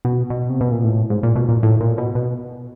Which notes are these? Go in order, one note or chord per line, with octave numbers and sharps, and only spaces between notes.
B2
B2
C3
B2
A#2
A2
G#2
A#2
B2
A#2
A2
A#2
B2
B2